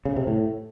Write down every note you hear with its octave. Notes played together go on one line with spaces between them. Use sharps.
C#3
C3
A2